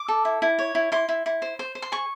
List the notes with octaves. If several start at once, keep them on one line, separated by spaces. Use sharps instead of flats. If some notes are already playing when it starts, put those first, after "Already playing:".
Already playing: D6
A4
E4
E4
C#5
E4
E4 C6
E4
E4
C5
C5
C5
C6
G#4 C#6